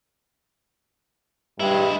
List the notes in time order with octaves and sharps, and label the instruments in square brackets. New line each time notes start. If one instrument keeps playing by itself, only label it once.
[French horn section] G2 [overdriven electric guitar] G#3 E4